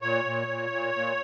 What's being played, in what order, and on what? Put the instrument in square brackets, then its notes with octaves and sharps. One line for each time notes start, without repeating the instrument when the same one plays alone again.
[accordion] A#2 C#5
A#2
A#2
A#2
A#2